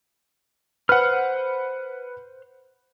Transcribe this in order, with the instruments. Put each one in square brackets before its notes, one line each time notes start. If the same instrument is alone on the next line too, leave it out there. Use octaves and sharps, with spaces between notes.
[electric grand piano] B4 F#5 [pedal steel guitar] C5 F6